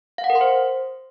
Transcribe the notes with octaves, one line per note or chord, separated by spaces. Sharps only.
F5
F#5
A#4
C6
C5